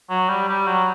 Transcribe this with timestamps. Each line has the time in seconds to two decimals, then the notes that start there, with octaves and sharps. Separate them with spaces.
0.10 F#3
0.29 G3
0.49 G3
0.67 F#3